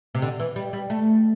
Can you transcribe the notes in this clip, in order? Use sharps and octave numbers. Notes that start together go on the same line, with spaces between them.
C3
D3
E3
G3
G3
A3